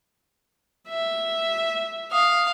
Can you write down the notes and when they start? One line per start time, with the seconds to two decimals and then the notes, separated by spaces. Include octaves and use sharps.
0.89 E5
2.12 F5 D#6